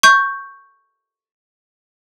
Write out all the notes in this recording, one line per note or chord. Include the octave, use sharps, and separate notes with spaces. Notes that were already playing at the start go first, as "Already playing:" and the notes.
C#6 G6